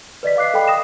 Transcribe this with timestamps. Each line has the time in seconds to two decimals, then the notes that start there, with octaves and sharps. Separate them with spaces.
0.23 B4 D5 D#5 B6
0.36 D#5 F5 D6 F#6 C7
0.54 A4 D#5 G5 B5
0.68 D#6 A#6 E7